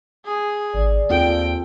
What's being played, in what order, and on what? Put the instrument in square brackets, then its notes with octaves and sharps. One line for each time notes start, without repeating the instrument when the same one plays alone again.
[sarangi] G#4
[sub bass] G#1 [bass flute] D5
[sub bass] D#2 [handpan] C4 F4 A4 [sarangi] G5